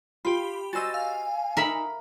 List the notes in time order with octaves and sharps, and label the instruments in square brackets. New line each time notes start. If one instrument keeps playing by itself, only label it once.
[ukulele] F4 F5 [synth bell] G4 B5
[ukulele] F#4 C5 D#5 [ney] G#5 [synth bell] E6 A6
[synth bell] F5
[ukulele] D#4 [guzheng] A#4 E5 B5